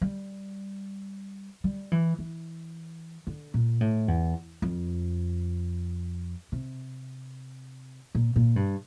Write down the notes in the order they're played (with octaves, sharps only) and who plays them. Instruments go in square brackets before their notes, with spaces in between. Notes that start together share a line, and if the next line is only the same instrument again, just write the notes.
[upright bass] G3
G3
E3
E3
D3
A#2
A2
E2
F2
C3
A#2
A#2
G2